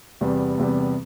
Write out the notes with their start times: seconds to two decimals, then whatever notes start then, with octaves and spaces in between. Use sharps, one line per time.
0.21 E2 C3 G3 B3
0.58 E2 C3 G3 B3